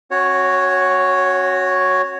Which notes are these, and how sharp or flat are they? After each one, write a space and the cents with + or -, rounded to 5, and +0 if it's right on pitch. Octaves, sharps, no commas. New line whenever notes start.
C#4 -35 F#4 +0 C#5 +0